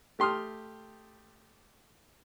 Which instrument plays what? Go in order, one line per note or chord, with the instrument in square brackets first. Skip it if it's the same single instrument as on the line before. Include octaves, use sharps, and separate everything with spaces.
[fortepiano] A3 G4 C6 D#6 F6